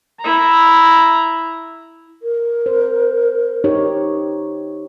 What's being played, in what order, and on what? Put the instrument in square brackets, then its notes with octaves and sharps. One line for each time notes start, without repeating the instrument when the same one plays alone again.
[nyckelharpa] E4 A#5
[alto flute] A#4
[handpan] C5
D#4 G4 C#5